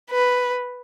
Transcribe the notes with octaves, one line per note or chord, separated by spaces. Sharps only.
B4